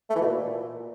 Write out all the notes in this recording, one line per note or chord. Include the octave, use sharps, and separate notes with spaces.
A3
E3
B2
A#2